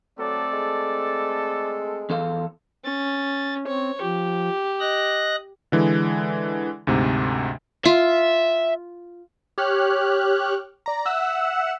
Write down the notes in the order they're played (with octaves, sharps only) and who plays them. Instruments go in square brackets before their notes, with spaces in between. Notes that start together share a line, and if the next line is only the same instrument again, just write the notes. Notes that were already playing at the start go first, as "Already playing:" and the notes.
[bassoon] F#3 [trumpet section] A3 C4 A4 [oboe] D5
[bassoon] G#3
[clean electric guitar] E2 A4 F5
[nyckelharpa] C#4 [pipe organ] A6
[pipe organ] C4 [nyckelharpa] C#5
[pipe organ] F3 [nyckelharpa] G4
[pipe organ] D#5 F#6 A#6
[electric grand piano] D3 E3 G#3
D2 G#2 C3
[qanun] F4 [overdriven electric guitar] E5
[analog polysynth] G4 C#5 F6 F#6
D5 A#5
E5 F#5 E6 F#6